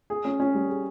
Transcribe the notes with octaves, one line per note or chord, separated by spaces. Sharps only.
G#4
C#4
C#4
G3
G#4